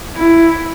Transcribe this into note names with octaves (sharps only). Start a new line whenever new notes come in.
E4